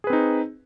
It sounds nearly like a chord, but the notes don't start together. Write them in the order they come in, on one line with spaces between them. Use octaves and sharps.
G#4 B4 C4 D#4